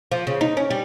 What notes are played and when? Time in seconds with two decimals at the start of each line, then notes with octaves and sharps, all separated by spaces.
0.12 F3
0.27 C#3
0.41 D#4
0.57 C#4
0.71 G3